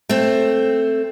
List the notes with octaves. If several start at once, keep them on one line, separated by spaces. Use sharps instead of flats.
A3 C4